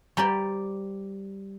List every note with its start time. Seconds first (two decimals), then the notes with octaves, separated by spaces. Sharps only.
0.17 G3 G4 C5 D5 A#5 B5